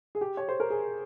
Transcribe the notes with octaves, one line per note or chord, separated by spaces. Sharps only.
G#4
G4
C#5
C5
A#4
G#4